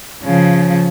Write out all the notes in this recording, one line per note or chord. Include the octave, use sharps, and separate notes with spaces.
C#3 F3